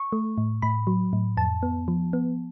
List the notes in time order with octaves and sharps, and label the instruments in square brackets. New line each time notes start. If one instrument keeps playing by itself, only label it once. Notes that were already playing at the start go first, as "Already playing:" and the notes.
Already playing: [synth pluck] C#6
A3
A2
A2 B5
F#3
A2
F2 A5
B3
F3
B3